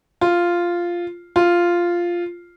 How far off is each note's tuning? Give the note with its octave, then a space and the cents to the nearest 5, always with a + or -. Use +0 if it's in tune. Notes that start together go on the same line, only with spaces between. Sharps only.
F4 -5
F4 -5